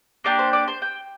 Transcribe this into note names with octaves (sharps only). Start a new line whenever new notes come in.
A#3 D4 G4 A#4
C5
D5
C5
G5